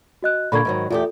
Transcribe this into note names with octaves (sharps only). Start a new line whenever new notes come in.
F#4 D#5 F#6
A#2 D3 A#3 B5 C#6 G#6
G#2 D#3 F#3
E2 A3 F4 G4 A4